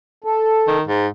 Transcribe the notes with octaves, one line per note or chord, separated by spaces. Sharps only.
A4
D#3
G#2